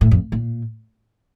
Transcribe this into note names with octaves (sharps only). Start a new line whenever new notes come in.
A2
F2
A#2